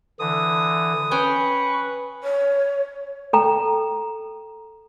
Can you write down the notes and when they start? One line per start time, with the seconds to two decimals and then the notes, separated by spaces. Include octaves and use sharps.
0.20 D3 E3 D#6
1.11 C#4 B4 G5 G#5 C#6
2.23 C#5
3.33 A4 G5 A#5